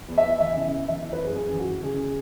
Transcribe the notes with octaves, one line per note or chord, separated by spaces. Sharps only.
E2
E5
E2
E3 E5
C#3
E2
E3 E5
E3
B4
F#2 G#4
F#2 G#4
E3
F#4
E3
C#3 G#4